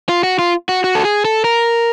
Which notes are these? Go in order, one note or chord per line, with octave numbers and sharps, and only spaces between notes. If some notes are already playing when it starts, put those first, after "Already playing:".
F4
F#4
F4
F#4
F#4
A4
G#4
A4
A#4